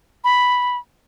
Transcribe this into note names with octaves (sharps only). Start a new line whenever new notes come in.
B5